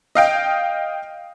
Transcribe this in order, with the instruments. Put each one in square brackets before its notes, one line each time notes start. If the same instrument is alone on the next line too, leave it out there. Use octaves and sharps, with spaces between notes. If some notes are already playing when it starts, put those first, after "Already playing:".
[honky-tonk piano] D#5 F5 G5